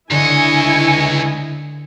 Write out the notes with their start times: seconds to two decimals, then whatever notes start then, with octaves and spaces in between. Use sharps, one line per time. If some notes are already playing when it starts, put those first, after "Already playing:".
0.11 C#2 D3 E4 D#5 G#5 C#6